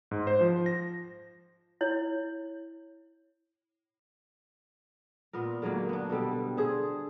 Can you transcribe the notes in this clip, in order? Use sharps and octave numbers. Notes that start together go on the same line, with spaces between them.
G#2
C5
F3
A#6
E4 C#5
A#2 B3 A#4
D3 F#3 G#3 A#3
B3 D4
B2 D3 G3 A4
G#4 A4 C5